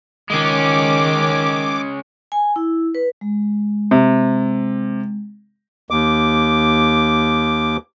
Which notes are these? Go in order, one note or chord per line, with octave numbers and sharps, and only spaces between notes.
D#3 G#3 C#4 D6
G#5
E4
B4
G#3
C3
D#2 D6